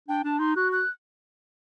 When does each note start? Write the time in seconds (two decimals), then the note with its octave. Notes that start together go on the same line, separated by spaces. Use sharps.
0.08 D4 G5
0.24 D4 A5
0.40 D#4 C6
0.56 F#4 F#6
0.72 F#6